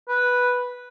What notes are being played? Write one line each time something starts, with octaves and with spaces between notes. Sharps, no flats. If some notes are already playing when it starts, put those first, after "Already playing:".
B4